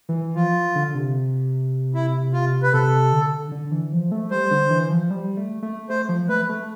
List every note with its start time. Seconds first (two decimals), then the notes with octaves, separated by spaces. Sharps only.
0.09 E3
0.36 F3 F4
0.75 D3
0.94 C3
1.94 E4
2.33 F4
2.63 B4
2.73 C3 A4
3.12 D3
3.52 D3
3.71 E3
3.92 F3
4.12 A3
4.31 G3 C5
4.51 D3
4.70 E3
4.90 F3
5.11 G3
5.37 A3
5.62 A3
5.90 A3 C5
6.09 F3
6.29 A3 B4
6.49 A3